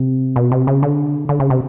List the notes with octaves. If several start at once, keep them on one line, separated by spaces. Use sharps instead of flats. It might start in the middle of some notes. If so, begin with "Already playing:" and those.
Already playing: C3
B2
C3
C#3
D3
D3
C#3
C3